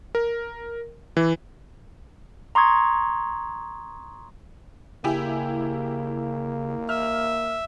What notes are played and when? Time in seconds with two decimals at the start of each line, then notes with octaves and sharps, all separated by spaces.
0.15 A#4
1.17 E3
2.55 A#5 C6 C#6 D#6 G#6
5.04 C#3 A#3 E4 G4 G#5
6.89 E5 F6